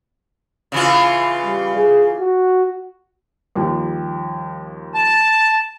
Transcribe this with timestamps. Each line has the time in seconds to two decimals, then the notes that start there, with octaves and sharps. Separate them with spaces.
0.72 C#3 E3 F4
1.46 G3
1.76 G#4
2.20 F#4
3.56 D#2 F3 G3
4.94 A5